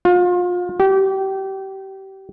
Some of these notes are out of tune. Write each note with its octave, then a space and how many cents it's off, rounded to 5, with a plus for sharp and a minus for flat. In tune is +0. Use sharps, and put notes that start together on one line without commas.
F4 +35
G4 -25